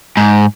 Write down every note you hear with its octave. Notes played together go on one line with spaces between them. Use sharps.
G#2